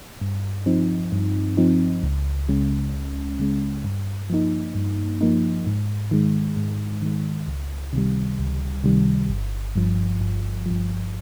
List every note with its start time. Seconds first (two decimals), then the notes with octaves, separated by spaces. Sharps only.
0.21 G2
0.66 F3 C4 D#4
1.12 G2
1.57 F3 C4 D#4
2.03 C#2
2.49 C#3 G#3 C#4
2.94 C#2
3.39 C#3 G#3 C#4
3.84 G2
4.30 F3 A#3 D#4
4.75 G2
5.21 F3 A#3 D#4
5.67 G#2
6.11 D#3 G#3
6.57 G#2
7.02 D#3 G#3
7.47 C#2
7.93 C3 D#3 G3
8.39 C#2
8.84 C3 D#3 G3
9.30 G1
9.75 G2 F3
10.21 G1
10.66 G2 F3